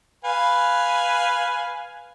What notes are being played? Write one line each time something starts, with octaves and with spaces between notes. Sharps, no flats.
B4 F5 G#5